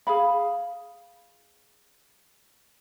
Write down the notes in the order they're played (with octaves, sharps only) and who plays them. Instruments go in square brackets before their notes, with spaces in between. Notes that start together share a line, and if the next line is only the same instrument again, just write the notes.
[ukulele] G#4 F5 B5